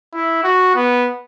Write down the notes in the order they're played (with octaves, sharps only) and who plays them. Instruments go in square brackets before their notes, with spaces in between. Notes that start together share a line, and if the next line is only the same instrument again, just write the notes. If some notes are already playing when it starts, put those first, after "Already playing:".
[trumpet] E4
F#4
B3